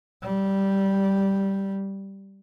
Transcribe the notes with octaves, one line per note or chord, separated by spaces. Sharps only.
G3